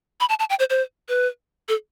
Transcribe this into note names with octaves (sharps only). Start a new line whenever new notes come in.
B5
A5
A5
G5
C5
C5
B4
A4